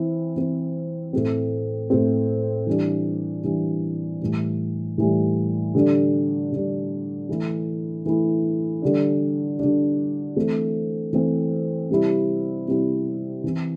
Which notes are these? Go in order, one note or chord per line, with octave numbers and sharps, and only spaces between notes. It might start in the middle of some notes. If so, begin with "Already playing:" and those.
Already playing: E3 C4 E4
E3 C4 E4
A2 A3 C4
A2 A3 C4
E3 G3 D4
E3 G3 D4
A2 E3 G3
A2 E3 G3
D3 G3 D4
D3 G3 D4
E3 A3 E4
E3 A3 E4
D3 G3 D4
D3 G3 D4
E3 A3 C4
E3 A3 C4
C3 G3 C4 E4
C3 G3 C4 E4
E3 C4 E4